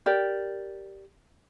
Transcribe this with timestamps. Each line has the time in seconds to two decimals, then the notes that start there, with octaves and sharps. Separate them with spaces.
0.06 G4 A#4 D5